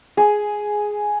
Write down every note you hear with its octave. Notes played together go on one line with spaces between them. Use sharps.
G#4